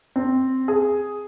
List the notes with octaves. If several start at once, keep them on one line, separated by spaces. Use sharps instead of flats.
C4
G#4